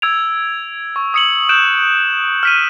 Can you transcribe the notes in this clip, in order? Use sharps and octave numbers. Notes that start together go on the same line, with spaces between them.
E6 G#6 D7 F7
C#6
D#6 C#7 F#7
F#6 G6 D7 E7
F6 B6 D#7